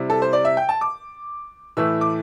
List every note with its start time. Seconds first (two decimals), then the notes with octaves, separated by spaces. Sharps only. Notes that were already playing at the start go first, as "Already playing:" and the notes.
Already playing: C3 G3 E4
0.10 A4
0.22 C5
0.33 D5
0.45 E5
0.57 G5
0.69 A5
0.81 D6
1.77 A2 E3 A3 E4 E6
2.01 D6